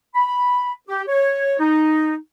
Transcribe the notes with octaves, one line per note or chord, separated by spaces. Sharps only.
B5
G4
C#5
D#4